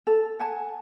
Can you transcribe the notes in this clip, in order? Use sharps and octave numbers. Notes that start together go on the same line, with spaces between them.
A4
F#5 G#5 A5